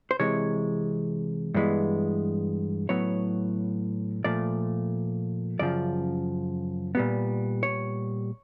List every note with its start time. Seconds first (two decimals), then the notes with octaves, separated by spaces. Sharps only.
0.11 C5
0.20 C3 E3 G#3 C#5
1.54 G2 E3 G#3 B3
2.89 A2 F#3 B3 C#5
4.24 A#2 F3 A3 D5
5.59 F#2 C#3 F3 D5
6.95 A#2 G3 B3
7.63 C#5